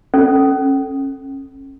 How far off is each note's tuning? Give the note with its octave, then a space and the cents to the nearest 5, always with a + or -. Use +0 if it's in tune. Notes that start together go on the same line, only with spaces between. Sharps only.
C#4 -35 A4 +0